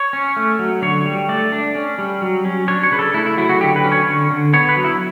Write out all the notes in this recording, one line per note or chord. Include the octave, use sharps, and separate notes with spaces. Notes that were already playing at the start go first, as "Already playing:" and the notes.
Already playing: C#5
C#4
A3
F#3
D3 C#5
G3
A3 D5
D4
C#4
G3
F#3
C#4
D4 C#5
C#5
C#3 B4
A4
A3 E4
E4
F#3 E4
F#4
D3 G4
B4
C#4
C#5
D3
D3
B3 C#5
B4
F#3
E4